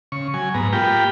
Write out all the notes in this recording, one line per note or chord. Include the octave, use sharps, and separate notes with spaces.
C#3 C#6
F#3 G#5
G#2 B3 A#5
A#3 F4 G4 G5 B5